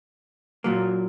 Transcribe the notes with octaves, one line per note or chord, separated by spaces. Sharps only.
A#2 F#3 A#3